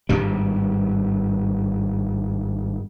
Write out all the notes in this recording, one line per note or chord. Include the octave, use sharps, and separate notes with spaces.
G#1 G2 G3